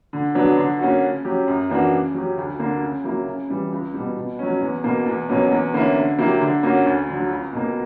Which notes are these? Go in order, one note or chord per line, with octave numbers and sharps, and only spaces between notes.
D3
F#3 B3 D4
D3
A#3 C#4 F#4
C#3
F#3 C#4 G4
F#2
E3 A#3 D4 F#4
C#3
F#3 C#4 G4
D2
D3 A#3
C#3
F#3 A#3 E4
C#3
E3 G3
C#2
B2 G3
B2
F#3 C#4
E2
B2 A#3
E2
B2 F#3 A#3 C#4
E2
D3 A#3 C#4 E4
D3
F#3 A#3 E4 G4
D3
A#3 C#4 F#4
D2
D3 F#3
C#2
B2 A#3